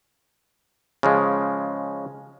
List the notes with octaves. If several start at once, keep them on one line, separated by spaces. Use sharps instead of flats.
C#3 F3 G#3